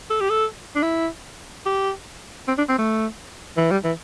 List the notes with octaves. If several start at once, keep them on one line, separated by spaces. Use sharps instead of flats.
A4
G4
A4
D4
E4
G4
C4
D4
C4
A3
E3
G3
E3